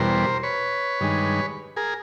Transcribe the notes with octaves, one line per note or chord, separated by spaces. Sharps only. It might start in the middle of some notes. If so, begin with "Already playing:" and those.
Already playing: E2 B2 G3 A#4 C5
B4 C#5
G2 D#3 G#3
G#4 A#4